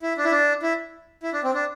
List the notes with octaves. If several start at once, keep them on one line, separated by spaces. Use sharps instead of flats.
E4
D4
E4
D4
E4
E4
D4
C4
D4